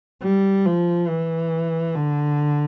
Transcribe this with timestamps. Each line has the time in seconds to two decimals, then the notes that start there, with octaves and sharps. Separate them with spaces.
0.23 G3
0.66 F3
1.08 E3
1.96 D3